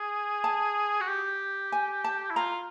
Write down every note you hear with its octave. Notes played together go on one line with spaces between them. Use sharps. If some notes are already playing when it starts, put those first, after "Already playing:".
Already playing: G#4
A5
F#4
G4
G#5
A5
E4
F4 A#5